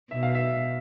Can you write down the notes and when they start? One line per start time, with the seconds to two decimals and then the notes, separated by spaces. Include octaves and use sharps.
0.11 B2 E5
0.23 F5
0.35 E5